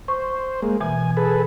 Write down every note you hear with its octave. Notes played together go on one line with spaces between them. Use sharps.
C5 C#6
G#3 A#3
B2 E3 G#5
G#4 A4 B4